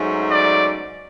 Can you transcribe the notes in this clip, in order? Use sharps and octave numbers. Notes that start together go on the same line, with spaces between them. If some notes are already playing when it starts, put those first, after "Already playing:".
Already playing: G#2 F#3 A3 C#4
D5